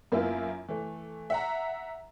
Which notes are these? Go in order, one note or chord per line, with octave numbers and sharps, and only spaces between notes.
F#2 A#3 B3 E4 F4
E3 A3
E5 F#5 A#5